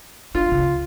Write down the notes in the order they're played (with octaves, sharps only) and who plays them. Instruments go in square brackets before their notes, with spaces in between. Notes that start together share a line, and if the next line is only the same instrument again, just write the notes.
[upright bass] D4 [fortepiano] F4
[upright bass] C#2 C#3